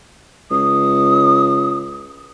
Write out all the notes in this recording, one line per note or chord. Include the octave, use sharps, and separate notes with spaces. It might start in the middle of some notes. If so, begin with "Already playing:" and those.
C#2 D#6